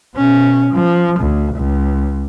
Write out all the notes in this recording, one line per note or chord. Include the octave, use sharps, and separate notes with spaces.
B2 C#4
F3
D2
C#2